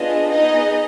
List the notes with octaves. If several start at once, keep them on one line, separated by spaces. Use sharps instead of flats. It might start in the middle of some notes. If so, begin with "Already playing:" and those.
Already playing: B3 D4 F4 G#4 D#5
B3 D#4 G#4 D#5